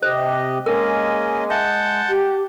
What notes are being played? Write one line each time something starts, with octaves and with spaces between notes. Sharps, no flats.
C3 G4 C5 D#5
G#3 A#3 C#4 A#4 D#5
E5 F#5 A5 G6
G4